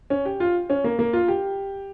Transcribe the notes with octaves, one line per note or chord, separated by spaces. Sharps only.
C#4
G4
F4
C#4
A#3
A#3
F4
G4